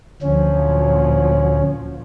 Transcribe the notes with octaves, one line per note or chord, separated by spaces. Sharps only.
D2 A#2 F3 F#3 C#4